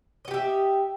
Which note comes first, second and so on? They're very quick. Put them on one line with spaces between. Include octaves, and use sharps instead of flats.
D#5 F#4 G4 E5